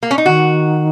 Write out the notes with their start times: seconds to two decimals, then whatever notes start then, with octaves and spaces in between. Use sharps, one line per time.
0.03 A#3
0.11 C#4
0.18 D#4
0.26 D#3 F#4